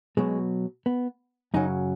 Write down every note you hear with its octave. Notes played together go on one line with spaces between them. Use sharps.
B2 F#3 G#3
B3
F#2 C#3 F#3 D#4